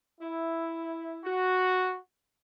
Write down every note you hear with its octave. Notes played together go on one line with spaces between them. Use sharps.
E4
F#4